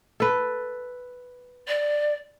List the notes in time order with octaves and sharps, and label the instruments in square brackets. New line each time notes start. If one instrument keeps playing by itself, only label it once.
[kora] A4 B4
[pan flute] D5